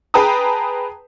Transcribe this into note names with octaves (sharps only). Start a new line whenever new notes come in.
G#4 B4 G5 A5 A#5 D#6